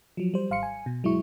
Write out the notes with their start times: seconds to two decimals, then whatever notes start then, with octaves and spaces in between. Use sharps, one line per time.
0.17 F3 F#3
0.34 G3 C5
0.51 G#1 F5 C6 C#7
0.63 G#5
0.86 B2
1.03 G1 F#3 G#3 E4 C#6